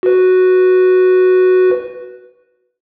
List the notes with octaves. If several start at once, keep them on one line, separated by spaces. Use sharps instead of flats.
F#4 B4